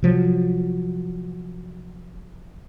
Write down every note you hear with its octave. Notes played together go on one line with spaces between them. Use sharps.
C3 F3 F#3